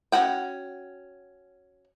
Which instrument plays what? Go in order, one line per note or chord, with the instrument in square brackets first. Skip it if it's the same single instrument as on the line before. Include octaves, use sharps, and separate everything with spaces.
[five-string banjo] C#4 F#4 F#5 G5